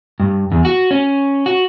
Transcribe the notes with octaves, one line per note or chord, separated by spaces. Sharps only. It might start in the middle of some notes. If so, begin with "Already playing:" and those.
G2
E2
F#4
C#4
F#4